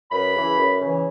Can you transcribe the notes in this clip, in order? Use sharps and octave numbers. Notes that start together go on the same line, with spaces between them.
F#2 B4 B5
C#3 E3
F#2
C#3 E3